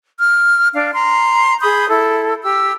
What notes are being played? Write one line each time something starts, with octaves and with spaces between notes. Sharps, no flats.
F6
D4 F5
A#5 C6
G#4 B5 D#6 G6
E4 A4
G4 E6